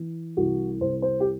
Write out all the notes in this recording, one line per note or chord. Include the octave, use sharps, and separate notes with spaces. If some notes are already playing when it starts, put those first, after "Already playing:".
Already playing: E3
C2 F#4
C2 C5
C5
G4